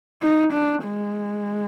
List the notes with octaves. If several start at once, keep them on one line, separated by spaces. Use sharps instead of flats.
D#4
D4
G#3